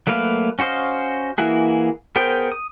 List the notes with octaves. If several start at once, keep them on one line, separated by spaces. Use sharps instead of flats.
F#3 A3 A#3 B4 F5
C#4 F#4 C5 D#5 F5
E3 A#3 E4 F#4 G#4
B3 G#4 A#4 C5 G5
D#6